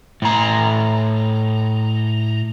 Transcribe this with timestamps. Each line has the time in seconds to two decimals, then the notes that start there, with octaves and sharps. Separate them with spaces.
0.22 A2 A#5